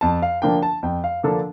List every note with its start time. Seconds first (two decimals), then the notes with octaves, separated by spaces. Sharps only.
0.01 F2 A5
0.22 F5
0.42 D3 F3 A#3 D4 G5
0.62 A5
0.83 F2 G5
1.04 F5
1.23 D3 F3 A#3 D4 A4